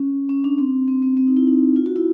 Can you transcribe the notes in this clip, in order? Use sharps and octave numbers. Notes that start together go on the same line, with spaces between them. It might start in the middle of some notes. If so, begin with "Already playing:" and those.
Already playing: C#4
C#4
D4
C4
C4
C4
C4
D#4
E4
D#4
F4
F#4
E4